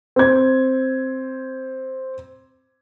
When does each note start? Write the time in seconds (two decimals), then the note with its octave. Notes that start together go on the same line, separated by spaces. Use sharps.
0.16 C4 G#6